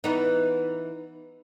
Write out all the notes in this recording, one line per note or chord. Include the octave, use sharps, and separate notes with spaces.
E3 B3 D#4